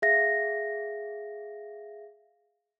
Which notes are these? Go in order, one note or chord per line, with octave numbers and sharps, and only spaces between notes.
G#4 E5 F5 A#6